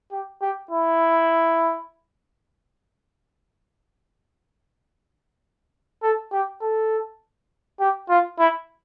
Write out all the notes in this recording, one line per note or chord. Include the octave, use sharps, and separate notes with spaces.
G4
G4
E4
A4
G4
A4
G4
F4
E4